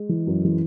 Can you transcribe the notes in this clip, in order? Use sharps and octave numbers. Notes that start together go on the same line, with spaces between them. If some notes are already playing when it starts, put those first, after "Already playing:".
Already playing: G#3
E3
F#2
E3